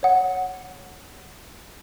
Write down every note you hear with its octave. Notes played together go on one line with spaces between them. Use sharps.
C#5 F#5